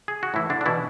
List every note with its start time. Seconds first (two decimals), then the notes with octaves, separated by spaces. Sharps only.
0.08 G#4
0.23 F#4
0.34 A2 E3 E4
0.50 D3 D4
0.61 D4
0.66 B2 E3 E4